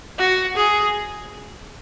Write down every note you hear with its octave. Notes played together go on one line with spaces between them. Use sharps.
F#4
G#4